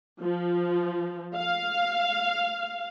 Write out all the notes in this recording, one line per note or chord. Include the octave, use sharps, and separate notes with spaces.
F3
F5